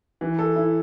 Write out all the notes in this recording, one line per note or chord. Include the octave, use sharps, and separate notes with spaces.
E3
A4
E4